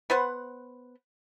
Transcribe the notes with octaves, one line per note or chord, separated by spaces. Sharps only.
B3 B4 C5 F#5